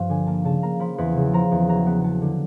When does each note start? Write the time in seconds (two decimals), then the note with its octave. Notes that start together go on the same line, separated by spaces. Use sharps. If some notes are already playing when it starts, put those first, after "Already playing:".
Already playing: G2 F3
0.10 D3 G#5
0.27 A#3 A5
0.44 C#3 A5
0.63 A#3 A#5
0.80 F3 B5
0.98 E2 B5
1.16 C#3
1.33 F3 A#5
1.51 E2
1.69 F#3 A#5
1.87 B3
2.04 B3 A5
2.22 D3